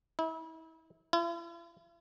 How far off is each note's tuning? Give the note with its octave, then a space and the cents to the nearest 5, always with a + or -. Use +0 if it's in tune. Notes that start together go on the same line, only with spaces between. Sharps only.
E4 -35
E4 +45